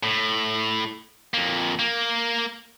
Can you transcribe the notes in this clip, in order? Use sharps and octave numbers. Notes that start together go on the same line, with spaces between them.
A2
F2 A#3
A#3